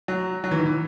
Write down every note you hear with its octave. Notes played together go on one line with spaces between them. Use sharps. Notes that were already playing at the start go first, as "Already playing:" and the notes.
F#3
F#3
E3
D#3
E3